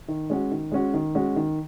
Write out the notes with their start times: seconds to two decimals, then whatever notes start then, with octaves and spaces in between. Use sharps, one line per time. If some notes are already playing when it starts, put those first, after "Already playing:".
0.08 D#3
0.30 G#3 C#4 F#4
0.52 D#3
0.72 G#3 C#4 F#4
0.94 D#3
1.15 G#3 C#4 F#4
1.36 D#3